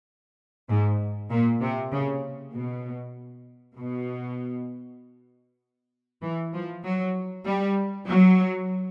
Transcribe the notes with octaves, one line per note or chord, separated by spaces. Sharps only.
G#2
A#2
C3
C#3
B2
B2
E3
F3
F#3
G3
F#3